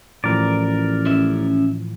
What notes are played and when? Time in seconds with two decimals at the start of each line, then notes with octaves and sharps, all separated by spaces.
0.24 A1 A2 E3 F3 A#4 D5
1.06 C#4 E5